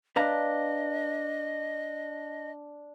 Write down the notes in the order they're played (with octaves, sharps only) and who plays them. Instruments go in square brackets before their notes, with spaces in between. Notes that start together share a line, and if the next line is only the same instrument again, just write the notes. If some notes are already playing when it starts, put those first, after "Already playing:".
[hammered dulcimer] D4 [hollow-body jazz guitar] B4 F5 A#5 [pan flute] D#5